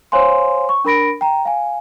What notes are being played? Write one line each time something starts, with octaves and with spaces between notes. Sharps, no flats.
C5 C#5 F5 G#5 C6
C#6
D4 A#4 B5 A#6 D7
G5 A#5
F5 G#5